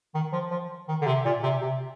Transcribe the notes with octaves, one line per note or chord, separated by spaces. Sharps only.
D#3
F3
F3
D#3
D3
C3
A#2
C3
C3